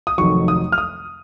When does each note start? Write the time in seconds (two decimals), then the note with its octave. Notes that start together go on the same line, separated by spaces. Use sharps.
0.07 D#6
0.18 F1 F2 D#3 F#3 C#6
0.48 D#6
0.72 F6
0.78 D#6